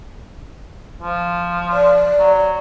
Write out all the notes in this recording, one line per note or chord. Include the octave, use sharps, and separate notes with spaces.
F3
D5
F#3